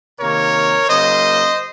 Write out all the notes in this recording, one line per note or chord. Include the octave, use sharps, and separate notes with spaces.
C3 D#3 A#3 A#4 C#5
C#3 F#3 A#3 C5 D#5